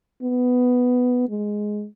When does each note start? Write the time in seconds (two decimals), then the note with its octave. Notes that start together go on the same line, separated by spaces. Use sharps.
0.23 B3
1.29 G#3